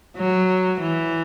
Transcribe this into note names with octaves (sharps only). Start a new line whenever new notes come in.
F#3
E3